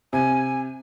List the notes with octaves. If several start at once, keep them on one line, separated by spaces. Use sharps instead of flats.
C3 G#5